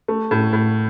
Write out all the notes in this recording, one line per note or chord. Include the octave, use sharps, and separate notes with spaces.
A3
A2
A2